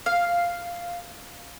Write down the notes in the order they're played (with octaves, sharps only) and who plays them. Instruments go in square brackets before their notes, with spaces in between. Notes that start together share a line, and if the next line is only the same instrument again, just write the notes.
[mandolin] F5